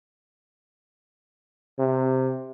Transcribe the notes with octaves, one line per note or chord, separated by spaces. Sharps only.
C3